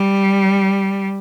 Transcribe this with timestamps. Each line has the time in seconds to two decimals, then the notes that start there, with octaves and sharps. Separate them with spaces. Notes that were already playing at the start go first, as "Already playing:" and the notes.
Already playing: G3